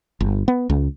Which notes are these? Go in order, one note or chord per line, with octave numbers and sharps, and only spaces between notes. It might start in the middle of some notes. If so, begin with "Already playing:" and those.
G1
B3
C#2